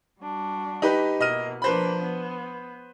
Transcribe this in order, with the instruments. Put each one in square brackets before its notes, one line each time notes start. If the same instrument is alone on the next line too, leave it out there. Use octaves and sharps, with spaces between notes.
[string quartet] G3 D4 F#4
[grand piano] D#4 G4 B4
[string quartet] B2 A#3 E4 [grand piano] D#5 F6 D#7
[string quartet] F3 A#3 D4 [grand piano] B4 C5 B5
[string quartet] B3